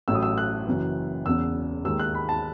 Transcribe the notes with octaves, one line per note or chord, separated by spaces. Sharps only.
A1 A2 F#3 E6
D#6
E6
F#6
F#1 F#2 E3
E1 E2 C#3 E6
D#2 D#3 G#3 E6
F#6
B5
A5